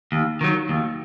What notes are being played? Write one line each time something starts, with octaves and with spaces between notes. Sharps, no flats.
D#2
D#3 F#3
D#2